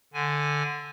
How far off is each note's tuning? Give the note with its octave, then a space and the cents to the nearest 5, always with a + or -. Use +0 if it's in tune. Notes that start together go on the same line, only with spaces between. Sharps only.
D3 +0 G#5 +0